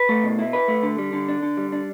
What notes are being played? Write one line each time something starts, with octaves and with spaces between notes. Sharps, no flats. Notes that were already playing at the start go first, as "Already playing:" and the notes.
Already playing: B4
A3
B2
E4
B4
A3
D3
G3
D3
D4
D3
G3
D4